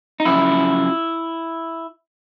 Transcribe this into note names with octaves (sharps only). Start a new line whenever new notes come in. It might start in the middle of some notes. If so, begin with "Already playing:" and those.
D#4
F#2 C#3 F3 E4